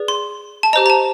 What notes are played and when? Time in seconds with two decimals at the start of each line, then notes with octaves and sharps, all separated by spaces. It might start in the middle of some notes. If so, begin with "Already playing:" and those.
Already playing: G#4 B4 D5
0.08 C6
0.63 A5
0.73 G4 C5 D#5 A#5
0.86 A#5
0.90 A5